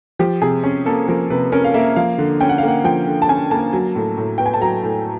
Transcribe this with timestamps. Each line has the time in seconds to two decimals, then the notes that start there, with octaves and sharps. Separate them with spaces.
0.19 F3 G4
0.42 C3 G#4
0.63 C#4
0.86 A#3 A4
1.08 F3 A#4
1.30 C3 B4
1.52 C#4 A#4
1.64 F5
1.74 A#3 E5
1.96 F3 F5
2.18 D3
2.40 C#4 G5
2.49 F#5
2.58 F5
2.63 A#3
2.68 F#5
2.84 F3 G5
3.07 D3
3.22 A5
3.29 C#4 G#5
3.51 A#3 A5
3.73 F#3
3.95 A2
4.17 A2
4.38 B3 G5
4.46 G#5
4.54 A5
4.61 F#3 A#5
4.83 A2